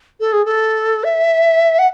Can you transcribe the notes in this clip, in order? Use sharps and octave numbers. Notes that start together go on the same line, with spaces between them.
A4
G#4
A4
E5
F#5